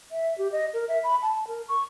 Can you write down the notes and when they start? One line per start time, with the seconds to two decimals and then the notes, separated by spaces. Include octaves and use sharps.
0.11 E5
0.38 G4
0.52 D#5
0.74 A#4
0.88 E5
1.04 B5
1.22 A5
1.47 A#4
1.68 C#6